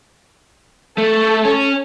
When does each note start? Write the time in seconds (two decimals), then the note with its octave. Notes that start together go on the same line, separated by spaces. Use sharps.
0.98 A3 A4
1.45 C#4